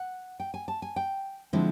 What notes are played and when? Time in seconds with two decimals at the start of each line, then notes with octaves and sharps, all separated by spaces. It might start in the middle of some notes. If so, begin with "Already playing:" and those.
Already playing: F#5
0.40 G5
0.54 G#5
0.68 A5
0.82 G#5
0.96 G5
1.53 D3 F3 G#3 C4 E4